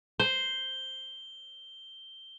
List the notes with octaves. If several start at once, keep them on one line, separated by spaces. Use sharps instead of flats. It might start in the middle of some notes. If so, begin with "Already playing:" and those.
C5 G7